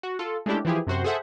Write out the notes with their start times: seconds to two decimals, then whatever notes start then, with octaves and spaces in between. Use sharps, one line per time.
0.03 F#4
0.19 F4 A4
0.46 G#3 A3 C#4 D4 E4 G4
0.65 E3 F3 E4 G4 G#4
0.87 F#2 C3 F#4 C5
1.04 G#4 A4 C5 E5 F#5